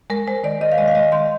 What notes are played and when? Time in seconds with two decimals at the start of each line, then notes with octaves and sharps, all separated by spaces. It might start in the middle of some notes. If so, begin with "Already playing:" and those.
0.10 G#3 A#4
0.27 G#3 C5
0.44 D#3 D5
0.61 D#3 D#5
0.72 F5
0.78 G#3 D#5
0.88 F5
0.95 G#3 D#5
1.12 D#3 C6